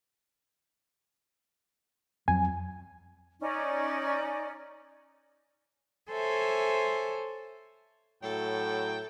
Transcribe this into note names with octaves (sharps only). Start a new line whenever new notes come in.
F2 F#3 G#5
C#4 D#4 D5
A4 C5 C#5 E5 G#5
A2 F#3 A4 G5